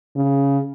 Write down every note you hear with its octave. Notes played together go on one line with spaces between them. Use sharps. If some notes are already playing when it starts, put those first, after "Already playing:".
C#3